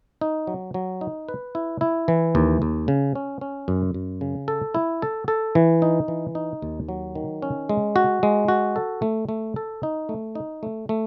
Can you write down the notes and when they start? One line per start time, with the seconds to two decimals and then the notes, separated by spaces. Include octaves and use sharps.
0.21 D#4
0.47 F#3
0.74 F#3
1.01 D#4
1.29 B4
1.55 E4
1.81 E4
2.08 E3
2.35 D#2
2.62 D#2
2.88 C#3
3.15 C#4
3.41 C#4
3.68 F#2
3.94 F#2
4.21 C#3
4.48 A4
4.75 E4
5.02 A4
5.28 A4
5.55 E3
5.82 D#4
6.08 E3
6.35 D#4
6.62 D#2
6.89 F#3
7.15 D#3
7.42 C#4
7.69 G#3
7.96 F#4
8.23 G#3
8.48 F#4
8.76 A4
9.02 A3
9.29 A3
9.56 A4
9.83 D#4
10.09 A3
10.35 D#4
10.63 A3
10.89 A3